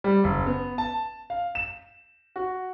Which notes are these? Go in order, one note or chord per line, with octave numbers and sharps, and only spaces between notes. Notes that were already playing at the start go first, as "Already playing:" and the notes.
G3
F#1
B3
A5
F5
E7
F#4